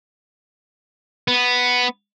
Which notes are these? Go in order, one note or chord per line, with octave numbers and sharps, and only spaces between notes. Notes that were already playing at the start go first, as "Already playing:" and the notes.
B3